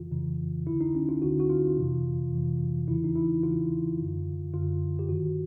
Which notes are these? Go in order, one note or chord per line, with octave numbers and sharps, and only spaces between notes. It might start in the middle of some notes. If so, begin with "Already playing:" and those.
Already playing: F2 C#3 E3 F4
F2 C#3 E3
D2 D3 E4
D#4
C#4
F4
D2 D3 F#4
F#4
F4
F2 C3 E3
F2 C3 E3
E2 C#3 E3 E4
D#4
E4
E2 C#3 E3 F4
F#2 D3
F#2 D3 F4
G4
G2 D#3 F#4